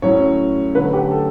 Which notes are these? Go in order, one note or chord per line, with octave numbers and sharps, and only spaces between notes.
A2 F#3 C#4 C#5
D3 F#3 A3 B4
G4
A4